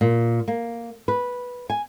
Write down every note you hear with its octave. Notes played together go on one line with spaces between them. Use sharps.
A#2
A#3
B4
G#5